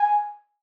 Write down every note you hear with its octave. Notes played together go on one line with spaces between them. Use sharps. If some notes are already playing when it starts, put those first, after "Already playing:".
Already playing: G#5